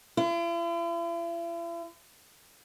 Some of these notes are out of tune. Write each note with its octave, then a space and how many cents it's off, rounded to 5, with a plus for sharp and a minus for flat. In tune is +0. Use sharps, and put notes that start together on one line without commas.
E4 +45